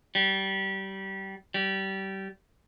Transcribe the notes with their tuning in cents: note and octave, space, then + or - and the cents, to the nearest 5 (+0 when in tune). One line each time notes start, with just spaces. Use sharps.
G3 -25
G3 -25